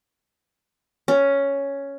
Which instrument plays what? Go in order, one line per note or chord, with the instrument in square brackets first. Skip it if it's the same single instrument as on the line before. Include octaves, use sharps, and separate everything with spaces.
[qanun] C#4